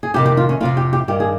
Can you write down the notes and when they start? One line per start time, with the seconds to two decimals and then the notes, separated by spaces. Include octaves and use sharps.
0.03 G#4
0.14 F2 C3 D#3 G4
0.26 G4
0.37 F4
0.49 C#4
0.61 F2 C3 F3 F4
0.77 G4
0.93 G4
1.08 G2 D#3 G4
1.20 G#4